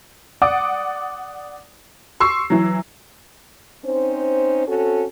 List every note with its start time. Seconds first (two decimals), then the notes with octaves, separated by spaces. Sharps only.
0.42 D5 F#5 D6 D#6
2.20 C6 C#6 E6 C7
2.50 E3 F#3
3.85 C4 C#4 D#4 C5
4.67 C4 C#4 F#4 A4